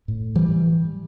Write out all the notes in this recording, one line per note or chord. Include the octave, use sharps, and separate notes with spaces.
A2
E3 G3